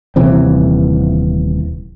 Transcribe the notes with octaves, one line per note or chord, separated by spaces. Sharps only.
D#1 C3 E3 C4